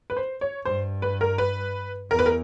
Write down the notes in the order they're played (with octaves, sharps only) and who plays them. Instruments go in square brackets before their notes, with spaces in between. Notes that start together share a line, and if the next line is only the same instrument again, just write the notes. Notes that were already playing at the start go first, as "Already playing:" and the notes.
[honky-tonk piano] B4
C5
C#5
[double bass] G2 [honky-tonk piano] C5
[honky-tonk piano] B4
A#4
B4
[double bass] E2 [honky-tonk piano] A#4
[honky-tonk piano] B4
A#4